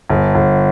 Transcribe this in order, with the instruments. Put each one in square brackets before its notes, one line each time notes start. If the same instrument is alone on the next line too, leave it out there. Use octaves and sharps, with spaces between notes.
[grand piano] G1
G1